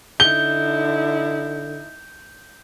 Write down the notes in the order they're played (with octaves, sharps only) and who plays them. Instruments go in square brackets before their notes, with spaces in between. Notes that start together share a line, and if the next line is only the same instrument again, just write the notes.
[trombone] D3 [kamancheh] D#4 E4 [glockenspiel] G6 [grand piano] G7